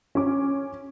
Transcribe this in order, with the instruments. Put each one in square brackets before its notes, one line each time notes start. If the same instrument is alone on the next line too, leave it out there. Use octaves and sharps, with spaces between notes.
[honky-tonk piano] C#4 D6